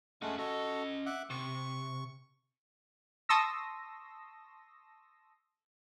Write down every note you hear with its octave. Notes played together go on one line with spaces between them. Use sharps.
G#3 A3 C#4 F#5
C#4 F#4 A4 D#5
E5 F#5 D6
C3 C#6
A5 C6 C#6 D#6 E6 A#6